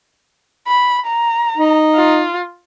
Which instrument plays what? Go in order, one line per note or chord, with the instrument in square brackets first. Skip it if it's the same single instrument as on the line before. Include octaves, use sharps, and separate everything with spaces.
[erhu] B5
A#5
[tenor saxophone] D#4
[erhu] F4